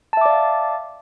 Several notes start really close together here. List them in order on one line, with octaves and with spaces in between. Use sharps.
A5 E5 D6 D5 F5